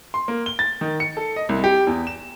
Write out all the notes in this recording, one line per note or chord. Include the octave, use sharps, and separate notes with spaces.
C6
A#3
G7
A6
D#3
C#7
A4
D#5
C2
G4
E2
E7